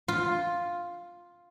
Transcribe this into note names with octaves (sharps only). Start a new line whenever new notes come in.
F4